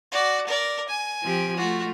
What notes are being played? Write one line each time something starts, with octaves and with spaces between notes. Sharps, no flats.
F#4 D5
A#4 D5
G#5
F3 C4 G4
A3 F4 F#4